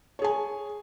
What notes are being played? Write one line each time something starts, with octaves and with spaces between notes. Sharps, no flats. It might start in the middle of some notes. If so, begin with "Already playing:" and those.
G#4 C#5 G#5